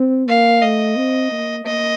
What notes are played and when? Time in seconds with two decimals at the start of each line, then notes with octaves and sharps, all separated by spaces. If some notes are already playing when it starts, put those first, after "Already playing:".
Already playing: C4
0.28 A#3 F5
0.62 A3 D#5
0.97 C4
1.32 A#3
1.66 A#3 D#5